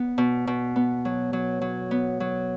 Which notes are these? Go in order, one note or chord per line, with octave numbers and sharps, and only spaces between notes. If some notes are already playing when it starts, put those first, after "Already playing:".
Already playing: B3
B2
B2
B3
F#3
F#3
F#3
B3
F#3